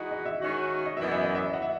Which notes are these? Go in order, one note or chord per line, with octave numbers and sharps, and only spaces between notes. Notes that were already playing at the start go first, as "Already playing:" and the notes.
Already playing: E3 G#3 D#4 F#4 G#4
D#5
E5
D#3 G#3 C#4 F#4
D#5
F#2 E3 B3 E5
E5
D#5
E5
F#5
E5